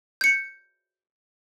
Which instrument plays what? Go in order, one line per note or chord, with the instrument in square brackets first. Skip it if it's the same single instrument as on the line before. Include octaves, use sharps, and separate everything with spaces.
[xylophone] G6 C#7